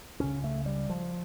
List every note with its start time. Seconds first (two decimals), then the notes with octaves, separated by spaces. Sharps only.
0.20 C#2 C#3 C#4
0.44 A3
0.66 G3
0.90 F3